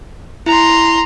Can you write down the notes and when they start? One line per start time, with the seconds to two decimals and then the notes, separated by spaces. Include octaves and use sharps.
0.46 E4 A#5 C6